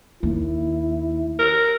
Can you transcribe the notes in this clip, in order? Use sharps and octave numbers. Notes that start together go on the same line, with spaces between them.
D#2 E4
A#4